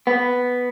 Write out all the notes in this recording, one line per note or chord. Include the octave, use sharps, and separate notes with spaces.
B3